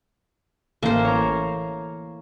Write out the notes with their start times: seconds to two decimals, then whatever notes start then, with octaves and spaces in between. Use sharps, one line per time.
0.83 A1 A#3 C5
1.05 C#5 A#5